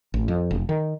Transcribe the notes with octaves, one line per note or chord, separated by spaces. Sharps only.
A1
F2
F1
D#3